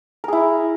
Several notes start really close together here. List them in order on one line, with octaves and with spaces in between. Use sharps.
A#4 G#4 E4